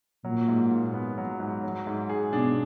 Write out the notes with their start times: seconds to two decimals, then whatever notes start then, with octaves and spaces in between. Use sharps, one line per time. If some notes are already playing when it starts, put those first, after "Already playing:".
0.25 A#2 F#3
0.48 G#2
0.72 F4
0.94 B3
1.18 F#3
1.40 G#2
1.63 F#3
1.87 G#2
2.09 G#4
2.33 B2 D4